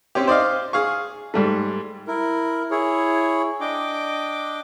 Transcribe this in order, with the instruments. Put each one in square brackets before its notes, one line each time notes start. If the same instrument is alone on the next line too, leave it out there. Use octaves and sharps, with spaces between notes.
[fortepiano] C4 C#4 G4
C5 D5 D#5 F5
G#4 F5 C#6
G#2 G3 A3
[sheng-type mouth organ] E4 A#4
E4 G#4 C#5
D4 D#5 G5 D6